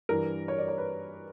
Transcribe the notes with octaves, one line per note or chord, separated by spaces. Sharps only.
G2 E3 A#4
C#5
D5
C#5
B4